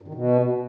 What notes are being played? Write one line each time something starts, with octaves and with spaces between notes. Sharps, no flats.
G2
D#3
B2